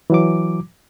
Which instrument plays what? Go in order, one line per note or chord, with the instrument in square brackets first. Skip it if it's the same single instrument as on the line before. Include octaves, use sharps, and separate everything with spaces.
[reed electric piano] E3 F#3 D6